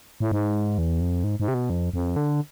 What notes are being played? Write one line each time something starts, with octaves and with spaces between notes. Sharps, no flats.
A2
G#2
E2
F2
G#2
G#2
C3
B2
F2
F2
D3